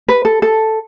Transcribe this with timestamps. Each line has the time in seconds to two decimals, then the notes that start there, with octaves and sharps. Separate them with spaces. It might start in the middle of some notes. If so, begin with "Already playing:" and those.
0.09 B4
0.25 A4
0.42 A4